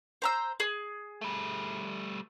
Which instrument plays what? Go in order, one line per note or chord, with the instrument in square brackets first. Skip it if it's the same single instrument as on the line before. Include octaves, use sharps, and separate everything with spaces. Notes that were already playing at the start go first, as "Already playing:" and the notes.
[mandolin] C5 A#5 E6
G#4
[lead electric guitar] G3 A3